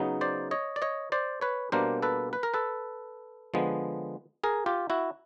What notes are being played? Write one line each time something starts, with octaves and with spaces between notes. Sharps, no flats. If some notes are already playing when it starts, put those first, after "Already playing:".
Already playing: C#3 F#3 B3 D#4
C5 D5
C#5 D#5
D5
C#5 D#5
C5 D5
B4 C#5
B2 G3 A#3 D4 A#4 C5
A4 B4
B4
A#4
A4 B4
D3 F3 G#3 B3
G#4 A#4
F4 G4
E4 F#4